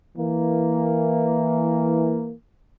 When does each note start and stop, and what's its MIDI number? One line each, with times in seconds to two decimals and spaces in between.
0.17 2.34 52
0.17 2.34 58